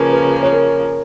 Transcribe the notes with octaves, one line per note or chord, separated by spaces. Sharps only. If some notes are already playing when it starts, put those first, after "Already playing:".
Already playing: C#3 F3 A#3 C#4 A#4 B4
B4
C#5
A#4